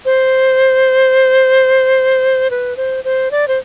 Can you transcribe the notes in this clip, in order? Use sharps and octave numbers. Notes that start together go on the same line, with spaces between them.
C5
B4
C5
C5
D5
C5